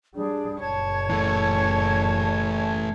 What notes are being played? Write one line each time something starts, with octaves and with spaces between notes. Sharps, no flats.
G3 D4 G#4
F#1 A#2 C#5 A5 G#6
E3 A3